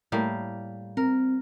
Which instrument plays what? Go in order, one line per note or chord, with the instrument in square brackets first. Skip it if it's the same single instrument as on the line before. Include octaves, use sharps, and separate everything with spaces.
[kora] A2 G3 A#3
[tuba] C4 [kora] A#4